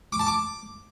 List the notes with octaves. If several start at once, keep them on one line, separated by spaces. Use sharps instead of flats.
D6
A5
D6